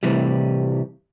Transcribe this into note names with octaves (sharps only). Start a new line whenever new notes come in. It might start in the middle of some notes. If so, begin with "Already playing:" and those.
C2 A2 C3 E3 G3